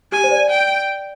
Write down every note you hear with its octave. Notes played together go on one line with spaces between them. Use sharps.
G4 G#5
C5
D5
G5